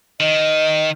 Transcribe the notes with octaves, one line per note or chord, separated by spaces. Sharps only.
D#3 D#5